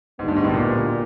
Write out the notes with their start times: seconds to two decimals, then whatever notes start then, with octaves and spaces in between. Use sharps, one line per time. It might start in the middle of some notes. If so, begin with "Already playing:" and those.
0.19 D2 G#2 D3 G3 B3
0.28 G2
0.36 G#2
0.44 A2
0.53 A#2